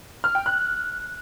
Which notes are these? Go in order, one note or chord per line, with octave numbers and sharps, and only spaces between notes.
F6
G5
F#6